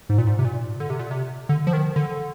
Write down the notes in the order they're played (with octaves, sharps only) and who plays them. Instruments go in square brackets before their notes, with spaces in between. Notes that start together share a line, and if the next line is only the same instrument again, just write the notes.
[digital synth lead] G#2
A#2
G#2
C3
A#2
D3
C3
A#2
C3
D3
F3
D#3
D3